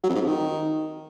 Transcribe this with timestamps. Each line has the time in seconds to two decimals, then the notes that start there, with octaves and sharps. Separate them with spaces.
0.04 F#3
0.09 F2
0.15 G#2
0.21 F2
0.27 D#3